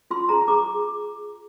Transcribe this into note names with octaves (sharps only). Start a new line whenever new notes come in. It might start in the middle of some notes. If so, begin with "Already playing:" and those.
F4 C6
G#4 A#5
G#4 D6